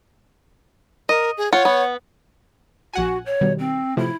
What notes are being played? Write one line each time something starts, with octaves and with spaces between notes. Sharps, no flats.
A#4 D#5
G#4
F4 C#5 F#5
B3
A#1 F#4 F#5 G#5
C#5
B2 D#3 G3
C4
A2 C3 F3 E4